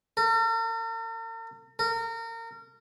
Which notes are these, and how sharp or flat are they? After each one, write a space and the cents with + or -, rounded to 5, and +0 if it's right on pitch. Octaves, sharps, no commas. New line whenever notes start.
A#4 -45
A#4 -30